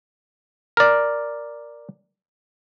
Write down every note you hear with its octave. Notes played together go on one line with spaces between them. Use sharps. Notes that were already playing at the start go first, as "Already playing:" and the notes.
A#4 D5